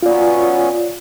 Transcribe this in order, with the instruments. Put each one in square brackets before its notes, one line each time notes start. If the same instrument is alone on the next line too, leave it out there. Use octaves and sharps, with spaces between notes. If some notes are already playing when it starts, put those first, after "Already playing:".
[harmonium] F#3 B3 C#4 [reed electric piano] F4 D5